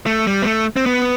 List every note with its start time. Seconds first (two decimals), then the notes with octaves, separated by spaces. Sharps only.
0.06 A3
0.27 G3
0.42 B3
0.46 A3
0.76 C4
0.86 B3